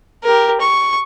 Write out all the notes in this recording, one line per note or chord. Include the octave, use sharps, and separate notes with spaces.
G4 A#4
C#6